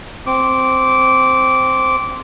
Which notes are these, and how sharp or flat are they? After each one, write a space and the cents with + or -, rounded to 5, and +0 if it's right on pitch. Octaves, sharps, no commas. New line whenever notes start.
C4 +0 D6 -15